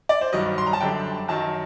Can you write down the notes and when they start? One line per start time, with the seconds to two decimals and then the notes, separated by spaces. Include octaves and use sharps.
0.09 D5
0.21 C5
0.33 G2 D#3 F#3 D#5
0.58 C6
0.66 A#5
0.73 A5
0.80 F#2 D3 G3 D4 G5
1.28 F#2 D#3 F#3 A5